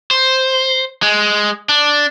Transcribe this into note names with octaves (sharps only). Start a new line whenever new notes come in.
C5
G#3
D4